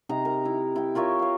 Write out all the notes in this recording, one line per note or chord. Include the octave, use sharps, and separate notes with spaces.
C3 D#4 A#5
A#4
E4
E4 G5
F4 A#4 C#5 E5
C#5 F5